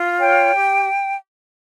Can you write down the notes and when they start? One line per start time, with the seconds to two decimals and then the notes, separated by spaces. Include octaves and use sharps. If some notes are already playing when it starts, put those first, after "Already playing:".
Already playing: F4
0.19 C#5 G5
0.54 G4